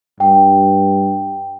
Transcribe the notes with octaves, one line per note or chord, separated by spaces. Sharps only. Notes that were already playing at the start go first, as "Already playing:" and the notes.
G2 G5